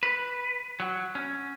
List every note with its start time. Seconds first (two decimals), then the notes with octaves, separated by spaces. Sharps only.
0.03 B4
0.80 F#3
1.15 C#4